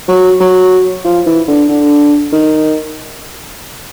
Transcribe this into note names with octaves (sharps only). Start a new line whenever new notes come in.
F#3
F#3
F3
E3
D3
D3
D#3